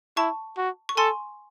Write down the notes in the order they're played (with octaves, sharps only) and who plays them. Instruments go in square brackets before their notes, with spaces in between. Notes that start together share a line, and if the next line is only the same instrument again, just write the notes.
[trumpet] E4 [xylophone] A5 C#6
[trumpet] F#4
[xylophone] C#6
[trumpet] A4 [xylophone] G#5 C6